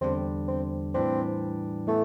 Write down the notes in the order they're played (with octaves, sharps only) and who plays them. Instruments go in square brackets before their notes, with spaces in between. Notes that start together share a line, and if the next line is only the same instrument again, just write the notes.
[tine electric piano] E2 D3 G3 D4 G4 [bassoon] C4
[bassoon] C4
[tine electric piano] A2 E3 G3 D4 G4 [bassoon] C4
[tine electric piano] A2 E3 B3 [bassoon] A3